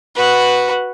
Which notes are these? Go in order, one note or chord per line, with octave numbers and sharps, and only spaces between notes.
F#4 B4